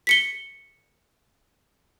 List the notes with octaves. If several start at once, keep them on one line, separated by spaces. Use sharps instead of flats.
B6 C#7 G7